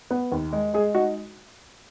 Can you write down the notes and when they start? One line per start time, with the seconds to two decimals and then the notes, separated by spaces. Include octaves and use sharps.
0.11 B3
0.32 D#2
0.53 G#3
0.74 G#3 G#4
0.95 D#4 F#4